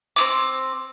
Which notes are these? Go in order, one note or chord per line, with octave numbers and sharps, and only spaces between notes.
C4 D#4 D6